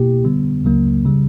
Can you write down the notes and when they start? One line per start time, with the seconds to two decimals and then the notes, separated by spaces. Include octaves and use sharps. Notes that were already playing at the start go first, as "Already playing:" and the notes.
Already playing: B2 A#3 E4 G4
0.24 D3 G3 B3
0.64 C#2 C#3 F#3 A#3
1.05 C#3 G3